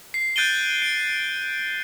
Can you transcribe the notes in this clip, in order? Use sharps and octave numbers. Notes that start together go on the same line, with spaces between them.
C7
F#6 G6 A6 D7 D#7 G7
D7